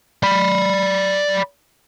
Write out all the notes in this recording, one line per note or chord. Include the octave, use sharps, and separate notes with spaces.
D5 B5